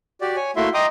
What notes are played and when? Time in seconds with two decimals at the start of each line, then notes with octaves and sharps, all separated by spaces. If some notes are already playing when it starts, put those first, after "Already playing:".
0.21 F#4 G4 D5
0.36 C#5 G#5
0.56 A3 A#3 E4 F#4 E5 C6
0.74 D#5 G5 A#5 C6 D6 D#6